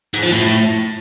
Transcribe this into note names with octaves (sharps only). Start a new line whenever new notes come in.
G#2
F3
A2